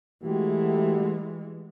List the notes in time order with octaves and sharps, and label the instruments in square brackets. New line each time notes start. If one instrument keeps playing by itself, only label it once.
[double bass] E3 G#3 [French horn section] A3 F#4 G4